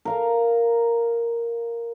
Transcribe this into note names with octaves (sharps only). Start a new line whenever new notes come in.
A#4 F5 A#5